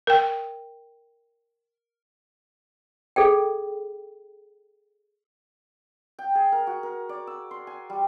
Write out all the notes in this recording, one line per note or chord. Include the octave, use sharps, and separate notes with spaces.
A#4 G5
G#4 A4 D5 G5
G5
G#4
A#4
F#4
A#4
D5
E6
C6
G#5
G3